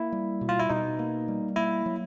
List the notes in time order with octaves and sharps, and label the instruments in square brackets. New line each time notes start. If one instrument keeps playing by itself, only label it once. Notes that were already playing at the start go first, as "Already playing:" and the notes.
Already playing: [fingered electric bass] A#3 [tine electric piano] E4
[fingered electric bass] G3
B2
[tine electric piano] F4
E4
[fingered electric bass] B2 [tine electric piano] D#4
[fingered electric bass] A#3
G3
[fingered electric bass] A#3 [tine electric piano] E4
[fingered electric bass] F#3